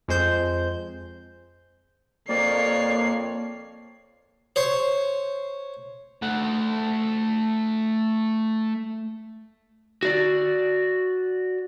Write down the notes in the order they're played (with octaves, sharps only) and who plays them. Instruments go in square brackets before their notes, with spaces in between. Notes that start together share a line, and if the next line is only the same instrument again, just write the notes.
[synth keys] F2 G#3 C5 G6
[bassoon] F2 [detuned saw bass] A#3 [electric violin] C#5 C7 [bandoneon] D5
[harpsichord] C5 C#5 C6
[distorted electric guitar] A3 F#5
[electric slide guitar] F#4 D5